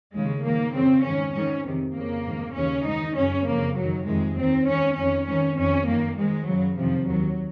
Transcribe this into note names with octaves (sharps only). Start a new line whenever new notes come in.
D#2 C#3 G#3
G#2 D#3 A#3
F2 C#3 C4
G#2 D#3 C#4
G#2 D#3 C#4
F2 C3 D#3
F2 C#3 A#3
G#2 D#3
D#2 C#3 C#4
G#2 D#3 D#4
F#2 C#3 C#4
F2 C#3 A#3
F#2 F#3
D#3
F2 C3 D#3 G#3
D#2 D#3 C4
G#2 D#3 C#4
F2 D#3 C#4
G#2 D#3 C#4
F2 D#3 C#4
F#2 D#3 A#3
G#2 D#3 G#3
F#2 C#3 F#3
F2 C3 D#3 F3
D#2 D#3 F#3